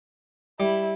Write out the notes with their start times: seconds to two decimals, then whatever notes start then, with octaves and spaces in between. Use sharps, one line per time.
0.60 G3 E4